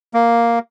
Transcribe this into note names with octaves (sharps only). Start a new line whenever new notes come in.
A#3